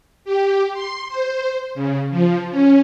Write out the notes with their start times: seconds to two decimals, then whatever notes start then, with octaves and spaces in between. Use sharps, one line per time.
0.25 G4
0.74 C6
1.09 C5
1.75 C#3
2.10 F3
2.51 C#4